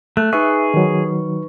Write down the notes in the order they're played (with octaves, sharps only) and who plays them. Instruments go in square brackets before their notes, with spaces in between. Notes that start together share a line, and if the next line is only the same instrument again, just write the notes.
[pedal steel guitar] A3 [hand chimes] F#6
[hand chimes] D#4 B4 C#6 [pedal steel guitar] G#4 [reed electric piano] E5
[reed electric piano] D#3 F#3